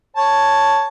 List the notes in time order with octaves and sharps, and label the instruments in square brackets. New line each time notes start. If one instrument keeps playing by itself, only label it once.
[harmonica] C#5 A5